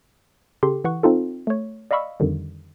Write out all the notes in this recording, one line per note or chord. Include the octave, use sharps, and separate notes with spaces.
C#3 G4 A4 C6
E3 F#5 C#6
C4 D#4 F4 A4
A3 C#5
D5 D#5 F5 B5 C#6 E6
F2 D3 D#3 G3